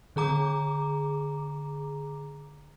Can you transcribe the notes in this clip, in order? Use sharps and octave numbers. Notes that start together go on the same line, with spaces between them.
D3 G#4 A#5 D6